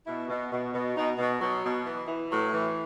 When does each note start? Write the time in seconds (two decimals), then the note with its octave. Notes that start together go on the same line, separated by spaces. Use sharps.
0.06 B2 E4
0.28 B2
0.52 B2
0.73 B2
0.96 B2 D#4
1.18 B2
1.41 B2 F#3
1.63 B2
1.86 E3
2.08 E3
2.30 A2 F#3
2.53 E3